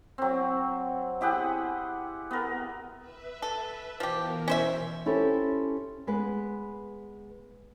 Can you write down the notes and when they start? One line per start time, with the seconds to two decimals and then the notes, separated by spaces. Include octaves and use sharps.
0.18 F#3 C4
1.21 E4 G4 G#4 F#5
2.31 B3 A#4
2.98 B4 E5
3.42 A4
4.00 B2 E3 F3 G4 A#4
4.48 C#4 C5 E5
5.06 C#4 E4 G4 A4 C5
6.07 G#3 B3 B4